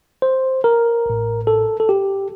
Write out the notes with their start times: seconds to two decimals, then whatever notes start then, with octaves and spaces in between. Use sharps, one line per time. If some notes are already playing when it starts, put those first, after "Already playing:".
0.22 C5
0.64 A#4
1.06 A1 A2
1.47 A4
1.80 A4
1.89 G4